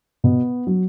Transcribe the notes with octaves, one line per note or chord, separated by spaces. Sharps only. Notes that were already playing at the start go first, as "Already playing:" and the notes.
B2 B3
F#3